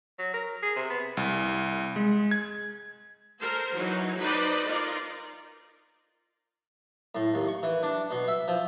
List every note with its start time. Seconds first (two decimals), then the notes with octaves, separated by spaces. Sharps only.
0.19 F#3
0.34 A#4
0.63 G#4
0.76 C3
0.90 B3
1.17 C2
1.96 G#3
2.31 G#6
3.40 A4 A#4 C5
3.74 E3 F#3 D#4
4.18 D#4 B4 C5 D5 D#5
4.66 D#4 F4 A#4 D5
7.15 A2
7.34 D#2
7.48 C#6
7.63 E3
7.83 D4
8.11 B2
8.28 E5
8.48 F3